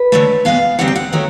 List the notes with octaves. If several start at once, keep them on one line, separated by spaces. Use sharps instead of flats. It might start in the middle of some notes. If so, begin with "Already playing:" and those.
Already playing: B4
D3 F#3 A3
B2 G#3 B3 F5
D3 G3 C4 D#4 F#5
G5
F#5
D#3 F#3 A3